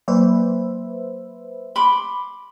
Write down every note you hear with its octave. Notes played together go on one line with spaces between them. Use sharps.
F#3 A#3 B4 C5 E5
B5 C6 D6